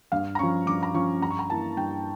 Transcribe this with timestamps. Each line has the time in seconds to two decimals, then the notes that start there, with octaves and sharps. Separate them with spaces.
0.12 G2 F5
0.35 A#5
0.39 F3 C#4 C#6
0.66 G2 D6
0.83 A#5
0.94 F3 C#4 C#6
1.22 G2 A#5
1.31 C#6
1.39 A#5
1.49 E3 A#3 A5
1.77 G2 G5